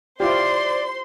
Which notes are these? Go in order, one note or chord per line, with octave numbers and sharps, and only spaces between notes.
E4 F4 G4 C5 D5 C6